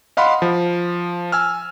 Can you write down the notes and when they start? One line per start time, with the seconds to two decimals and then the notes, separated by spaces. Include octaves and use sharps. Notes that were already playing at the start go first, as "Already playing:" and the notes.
0.17 D#5 F5 F#5 B5 C6
0.42 F3
1.32 G#5 E6 F6